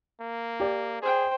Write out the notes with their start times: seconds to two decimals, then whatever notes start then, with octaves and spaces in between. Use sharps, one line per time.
0.21 A#3
0.60 G4 D5
1.02 G#4 C5 G5